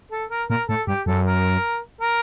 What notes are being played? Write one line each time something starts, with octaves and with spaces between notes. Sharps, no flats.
A4
A#4
A#2 A#4
A2 A4
G2 G4
F#2 A4
A#4
A#4